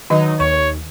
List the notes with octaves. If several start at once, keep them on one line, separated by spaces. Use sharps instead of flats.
D#3 F#3 D#4 D#5
D#2 C#5 C#6